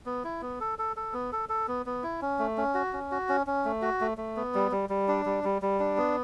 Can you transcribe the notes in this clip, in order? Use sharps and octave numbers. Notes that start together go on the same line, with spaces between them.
B3
E4
B3
A4
A4
A4
B3
A4
A4
B3
B3
E4
C#4
A3
C#4
F#4
C#4
F#4
C#4
C#4
A3
F#4
A3
A3
B3
G3
G3
G3
D4
G3
G3
G3
D4
B3